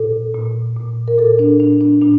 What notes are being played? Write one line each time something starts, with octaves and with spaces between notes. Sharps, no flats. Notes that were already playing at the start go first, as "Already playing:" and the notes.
Already playing: A#2 A4
A#2
A#2
A#4
A#2 A4
D4
A#2 D4
D4
A#2 D4